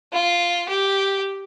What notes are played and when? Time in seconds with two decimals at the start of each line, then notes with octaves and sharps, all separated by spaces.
0.13 F4
0.70 G4